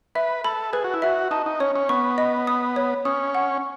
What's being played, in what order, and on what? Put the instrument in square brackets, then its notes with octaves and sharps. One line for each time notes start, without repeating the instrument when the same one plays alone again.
[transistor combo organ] B4 [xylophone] E5
[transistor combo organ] A4 [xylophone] B5
[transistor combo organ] G#4 [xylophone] B4
[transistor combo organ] F#4
E4
[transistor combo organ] F#4 [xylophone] E5
[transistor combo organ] D#4 [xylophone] A5
[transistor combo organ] D#4
[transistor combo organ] C#4 [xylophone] C#5
[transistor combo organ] C#4
[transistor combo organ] B3 [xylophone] C#6
[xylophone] D#5
D#6
C#5
[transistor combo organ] C#4 [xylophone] D#6
[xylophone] F#5